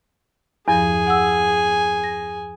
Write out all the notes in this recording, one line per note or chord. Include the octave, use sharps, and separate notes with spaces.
E2 G2 F3 G#4 G#5
F#5 E6
A#6